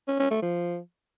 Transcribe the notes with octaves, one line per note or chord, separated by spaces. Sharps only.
C#4
C#4
A3
F3